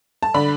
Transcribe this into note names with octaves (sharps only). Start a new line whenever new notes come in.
A5
D3 B5